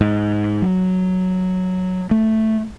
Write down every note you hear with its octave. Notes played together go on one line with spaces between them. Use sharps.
G#2
F#3
A3